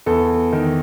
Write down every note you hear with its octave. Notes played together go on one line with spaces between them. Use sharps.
E2 A4
D#3